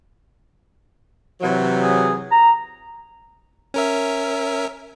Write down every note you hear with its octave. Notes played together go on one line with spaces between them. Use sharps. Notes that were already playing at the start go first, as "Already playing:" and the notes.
C3 E3 F#3
G#4
A#5
C#4 A#4 E5